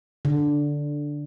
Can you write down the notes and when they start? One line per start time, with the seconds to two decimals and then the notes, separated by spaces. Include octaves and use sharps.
0.25 D3